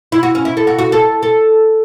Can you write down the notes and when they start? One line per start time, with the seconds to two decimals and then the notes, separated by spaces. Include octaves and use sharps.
0.12 E4
0.23 F#4
0.35 C#4
0.45 E4
0.57 A4
0.67 F#4
0.79 F#4
0.92 A4
1.23 A4